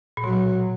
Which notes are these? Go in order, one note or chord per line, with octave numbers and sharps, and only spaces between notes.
A#2
B2 F#3